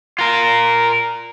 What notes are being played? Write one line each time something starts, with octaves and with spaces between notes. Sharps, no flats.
F4 A#4